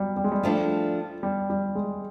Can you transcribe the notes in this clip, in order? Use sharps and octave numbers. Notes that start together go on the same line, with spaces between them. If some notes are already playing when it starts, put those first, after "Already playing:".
Already playing: F#3 G3
G3
G#3
G3
F3 A3 D4
G3
G3
G#3